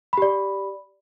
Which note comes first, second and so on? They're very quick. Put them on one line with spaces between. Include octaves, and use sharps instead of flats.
B5 G4 D5